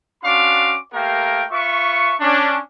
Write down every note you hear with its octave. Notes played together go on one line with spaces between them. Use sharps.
C#4 D4 F#4 F5 C6 D6
A3 A#3 G4 A#4 F5 G5
F4 B4 E5 C#6
C#4 D4